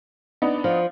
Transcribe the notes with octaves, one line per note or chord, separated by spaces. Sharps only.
B3 D4 D#4
F3